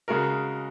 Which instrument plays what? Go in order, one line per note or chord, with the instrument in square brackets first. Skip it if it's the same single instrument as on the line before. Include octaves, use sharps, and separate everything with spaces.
[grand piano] C#3 G#3 F#4 A#4